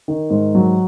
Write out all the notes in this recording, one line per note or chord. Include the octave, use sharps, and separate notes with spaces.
D#3
G#2
F#3